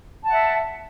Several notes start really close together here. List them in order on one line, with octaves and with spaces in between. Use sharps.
A5 F#5 E5